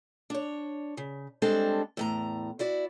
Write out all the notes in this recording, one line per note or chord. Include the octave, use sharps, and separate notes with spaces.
D4 C#5
C#3
G3 G#3 C4 D4 A4
E2 A2 A#5
E4 F#4 D5